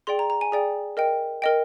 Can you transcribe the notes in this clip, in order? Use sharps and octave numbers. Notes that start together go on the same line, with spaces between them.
G#4 D5 G5 C6
A#5
A#5
G#5
G#4 D5 G5
A#4 D#5 G5
A#4 D#5 G5